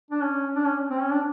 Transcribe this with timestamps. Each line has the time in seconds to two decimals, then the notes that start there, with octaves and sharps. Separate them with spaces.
0.11 D4
0.23 C#4
0.55 D4
0.66 C#4
0.89 C4
1.01 C#4
1.12 D4